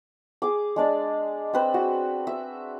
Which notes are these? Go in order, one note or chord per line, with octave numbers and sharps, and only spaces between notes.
G#4 D6
G#3 D4 D5
C4 B4 C5
F#4
E5